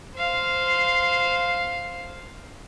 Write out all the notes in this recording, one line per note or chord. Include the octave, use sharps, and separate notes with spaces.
C5 F5